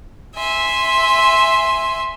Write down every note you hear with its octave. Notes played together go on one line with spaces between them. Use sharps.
E5 G#5 C6